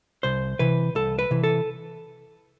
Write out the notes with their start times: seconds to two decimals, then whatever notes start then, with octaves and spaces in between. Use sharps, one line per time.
0.23 C2 C5
0.59 C3 E3 B4
0.95 C2 A4
1.19 B4
1.31 C3 E3
1.44 A4